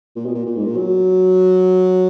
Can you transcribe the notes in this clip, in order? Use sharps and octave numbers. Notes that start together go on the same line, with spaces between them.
A#2
B2
A#2
A#2
G#2
A#2
F#3